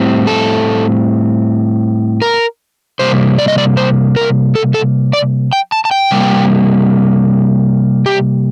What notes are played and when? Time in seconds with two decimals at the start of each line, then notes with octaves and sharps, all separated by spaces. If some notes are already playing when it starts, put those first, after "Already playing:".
Already playing: A2 G3 C4
0.27 A4
2.22 A#4
2.99 C3 G3 A#3 C5
3.38 D5
3.48 D#5
3.58 D5
3.77 C5
4.16 A#4
4.55 A4
4.74 A4
5.13 D5
5.53 G5
5.72 A5
5.85 A5
5.91 G5
6.11 C3 G3 A#3
8.06 G4